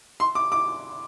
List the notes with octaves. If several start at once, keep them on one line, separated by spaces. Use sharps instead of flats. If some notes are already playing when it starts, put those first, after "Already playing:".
C6
D6
D6